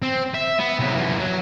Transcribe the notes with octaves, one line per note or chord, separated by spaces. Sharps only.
C4
E5
B3
C3 F#3
F#2 E3
F#3